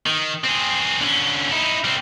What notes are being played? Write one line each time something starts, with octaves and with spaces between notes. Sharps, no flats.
D#3
C4 G#4
D3 C#4
D#4 E4
G3 C4